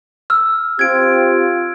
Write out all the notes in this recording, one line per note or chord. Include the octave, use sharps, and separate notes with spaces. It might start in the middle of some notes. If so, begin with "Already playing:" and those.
E6 F6
C4 F4 G4 G#6 D7